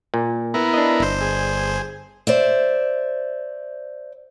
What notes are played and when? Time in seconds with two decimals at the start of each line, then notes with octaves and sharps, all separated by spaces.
0.14 A#2
0.54 B3 E4 A#4
0.74 D4 D#5
1.00 G1 C5
1.21 G#4
2.27 C5 D5 E5